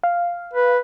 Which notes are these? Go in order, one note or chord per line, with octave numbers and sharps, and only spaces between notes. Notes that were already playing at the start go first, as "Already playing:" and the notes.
F5
B4